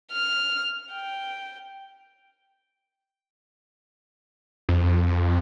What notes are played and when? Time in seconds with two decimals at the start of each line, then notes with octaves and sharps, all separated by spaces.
0.12 F6
0.93 G5
4.69 F2